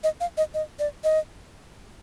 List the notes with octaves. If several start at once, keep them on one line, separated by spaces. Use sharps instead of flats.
D#5
F5
D#5
D#5
D5
D#5